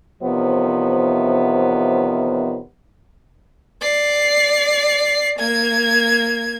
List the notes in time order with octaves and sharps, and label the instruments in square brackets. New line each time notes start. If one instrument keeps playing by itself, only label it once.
[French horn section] E2 C3 D#3 F3 B3 C#5
[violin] D5 C7
A#3 G#6